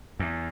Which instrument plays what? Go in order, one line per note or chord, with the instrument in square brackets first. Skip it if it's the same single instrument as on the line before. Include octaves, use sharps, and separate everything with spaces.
[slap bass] E2